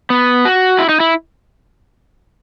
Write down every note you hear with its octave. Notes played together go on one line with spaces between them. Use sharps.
B3
F#4
E4
D#4
E4